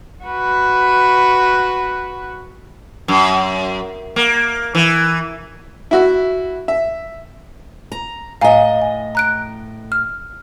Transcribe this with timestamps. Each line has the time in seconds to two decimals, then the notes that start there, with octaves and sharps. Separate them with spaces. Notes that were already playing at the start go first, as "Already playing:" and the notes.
0.24 F#4 B4
3.08 F#2
4.16 A#3
4.75 E3
5.91 E4 F#4 E5
6.68 E5
7.92 A#5
8.41 A2 D#5 F5 G#5 A#5
8.82 G#5
9.15 A#5 F#6 D7
9.92 F6